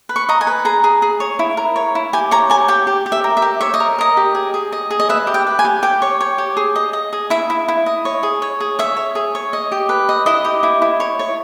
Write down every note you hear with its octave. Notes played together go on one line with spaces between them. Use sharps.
B4
C#6
D#5 A#5
G#5
B4
G#4 A#5
G#4
G#4
C#5
E4
A#4
C#5
E4
G4 G#5
C#5 A#5
G4 G#5
G4 G5
G4
G4
E5
A#4
E5
G4
C#5 E5
D#5
A#4
A#4 D#5
G4
G#4
G#4
D#5
G#4
D#5
B4 E5
G4
G5
B4
G#5
G4
G4 G5
C#5
C#5
G4
G#4
D#5
D#5
G#4
E4 E5
E4
E4
D#5
C#5
G#4
C#5
G#4
C#5 E5
C#5
G#4
C#5
D#5
G4
B4
D#5
E4 D#5
G4
E4
E4
C#5
C#5